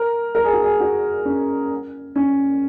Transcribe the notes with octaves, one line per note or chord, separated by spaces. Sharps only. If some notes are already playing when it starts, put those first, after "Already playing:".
Already playing: A#4
A#4
G#4
F#4
G#4
F#4
C#4
C#4